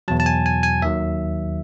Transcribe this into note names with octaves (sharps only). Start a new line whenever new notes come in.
E2 B2 F#3 A5
A5
G#5
G#5
G#5
D#2 D#3 F#3 E5